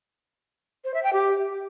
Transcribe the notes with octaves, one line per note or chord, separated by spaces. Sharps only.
C5
E5
G5
G4